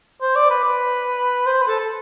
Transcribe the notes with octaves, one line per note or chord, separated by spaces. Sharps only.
C5
D5
B4
B4
C5
B4
A4
A4